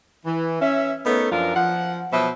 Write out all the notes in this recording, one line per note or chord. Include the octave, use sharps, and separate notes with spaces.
E3
C#4 E5
A3 B3 D#4 A4 A#4 C#5
F#2 F3 D4 F4 A#4
F3 F#5
B2 F3 F#3 C5 E5